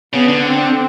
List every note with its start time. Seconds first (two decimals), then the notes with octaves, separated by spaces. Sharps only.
0.13 C#3 B3
0.28 D3
0.44 C4